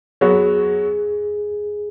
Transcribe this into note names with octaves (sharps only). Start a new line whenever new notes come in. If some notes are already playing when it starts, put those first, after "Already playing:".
F#3 B3 F#4 G#4 C#5